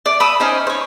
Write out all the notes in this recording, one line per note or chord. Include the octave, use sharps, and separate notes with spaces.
D5
B5 D#6 E6
C#4 D#4 C5
C5 C#5